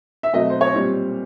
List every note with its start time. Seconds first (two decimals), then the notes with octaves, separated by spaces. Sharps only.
0.23 E5
0.33 B2 F#3 A3 C4 D#5
0.50 C5
0.61 C#5
0.74 A#2 G3 C4